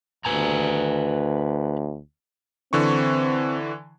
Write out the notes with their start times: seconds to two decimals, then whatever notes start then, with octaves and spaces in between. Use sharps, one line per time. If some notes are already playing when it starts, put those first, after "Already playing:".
0.25 D2 B4 G#5 A#5
2.73 D3 E3 C4 C#6